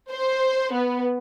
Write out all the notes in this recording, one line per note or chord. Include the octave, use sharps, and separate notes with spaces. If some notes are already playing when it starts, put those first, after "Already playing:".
C5
B3